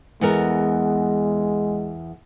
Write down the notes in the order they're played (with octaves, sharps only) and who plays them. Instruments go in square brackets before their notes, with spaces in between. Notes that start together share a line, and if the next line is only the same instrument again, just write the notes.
[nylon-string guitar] E2 B3 A#4 [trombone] G#3